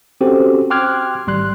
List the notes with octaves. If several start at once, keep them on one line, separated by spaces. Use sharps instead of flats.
C4 C#4 F#4 G4 A4 C5
G5 C6 D6 F6 F#6 G#6
G#1 G3 C6 F#6